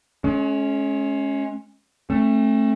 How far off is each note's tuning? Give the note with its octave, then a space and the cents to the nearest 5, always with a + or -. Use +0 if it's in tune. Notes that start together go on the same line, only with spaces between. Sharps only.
G#3 +40 C#4 +0
A3 +0 C4 +45